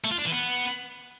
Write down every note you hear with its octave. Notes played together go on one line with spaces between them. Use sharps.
A3
F4
D4
E3
B3